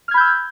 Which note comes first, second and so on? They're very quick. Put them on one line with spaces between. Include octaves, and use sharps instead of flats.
F6 G#6 B5 G6 E6